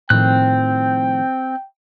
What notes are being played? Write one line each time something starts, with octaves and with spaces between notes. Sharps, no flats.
A2 D#3 F3 C4 G5 F#6